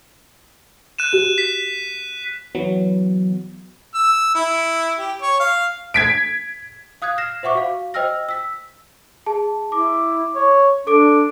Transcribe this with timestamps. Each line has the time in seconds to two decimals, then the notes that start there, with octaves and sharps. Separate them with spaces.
0.99 F#6 D#7 E7
1.13 F#4 G4
1.38 B6
2.55 E3 F#3 B3
3.94 E6
4.35 E4
4.98 G4
5.21 C#5
5.40 F5
5.94 G#6 B6 D7
7.02 F5 D#6 F#6 G#6
7.18 F6 A#6 C7 E7
7.43 C5 E5 F#5 C#6 D6
7.55 F#4 F5
7.94 C5 D#5 G5 E6 F6 A#6
8.29 E6 B6
9.26 G#4 A5
9.72 E4 D6
10.36 C#5
10.87 D4 A4 D6 D7